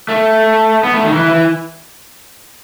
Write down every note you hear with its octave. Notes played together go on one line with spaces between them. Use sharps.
A3
B3
A3
D#3
E3
E3